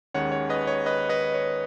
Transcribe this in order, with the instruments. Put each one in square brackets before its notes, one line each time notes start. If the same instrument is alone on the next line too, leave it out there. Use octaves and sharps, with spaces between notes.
[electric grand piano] D#2 D#3 G#3 C#4 C#5 F#5
C#5
B4 D#5
C#5
B4 D#5
B4 D#5
C#5